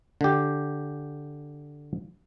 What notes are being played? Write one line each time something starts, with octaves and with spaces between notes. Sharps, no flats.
D3 G4